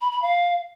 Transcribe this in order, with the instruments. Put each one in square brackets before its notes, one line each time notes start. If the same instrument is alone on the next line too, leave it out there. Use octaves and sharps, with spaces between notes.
[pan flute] B5
B5
F5